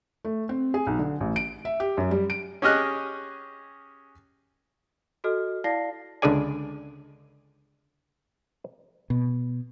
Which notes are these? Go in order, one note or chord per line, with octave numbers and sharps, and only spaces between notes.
A3
C4
G#4
B1
D3
A1
D7
E5
G4
F#2
G3
D7
C#4 G4 G#4 D#5 F6 F#6
F#4 A4 D#5 F6
E4 D5 F5 A5 A#6 C7
C#2 D3 D4 G#4 D5 G#5
B2